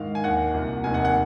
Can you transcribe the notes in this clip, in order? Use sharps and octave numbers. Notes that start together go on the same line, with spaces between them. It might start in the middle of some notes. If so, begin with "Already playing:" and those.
Already playing: G#2 D#3 F5
G#5
D#2 D#3 F#5
C2 A#2
F1 D#2 D#3 G#5
F#5
F#5